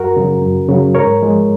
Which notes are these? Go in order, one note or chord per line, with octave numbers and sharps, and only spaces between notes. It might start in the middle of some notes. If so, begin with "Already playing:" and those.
Already playing: F#2 F#4 A#4
C#3 F#3
F#2
C#3 F#3
G#2 A#4 C#5
F3 G#3